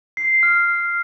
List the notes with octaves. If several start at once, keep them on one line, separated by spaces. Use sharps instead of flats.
C7
F6